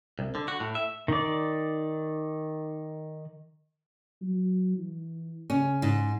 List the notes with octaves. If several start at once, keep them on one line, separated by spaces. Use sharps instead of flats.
C2
D3
F#4
A2
E5
D#3 D5
F#3
E3
C#3 C#4
G#2